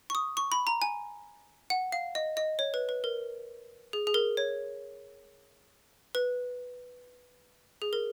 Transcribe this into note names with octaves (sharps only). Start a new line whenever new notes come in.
C#6
D#6
C#6
B5
A#5
G#5
F#5
F5
D#5
D#5
C#5
B4
B4
A#4
G#4
G#4
A#4
C#5
B4
G#4
A#4